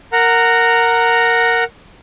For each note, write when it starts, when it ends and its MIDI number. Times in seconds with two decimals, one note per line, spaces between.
0.13 1.64 70
0.13 1.64 78
0.13 1.64 82